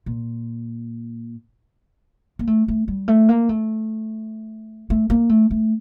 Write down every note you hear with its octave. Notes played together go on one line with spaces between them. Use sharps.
A#2
A#3
A3
A3
G3
A3
A#3
A3
A3
A#3
A3
A3